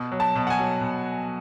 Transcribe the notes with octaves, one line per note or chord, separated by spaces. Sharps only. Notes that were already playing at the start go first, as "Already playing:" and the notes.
Already playing: B2
F#3
A5
B2
F#5
G#5
F#3
B2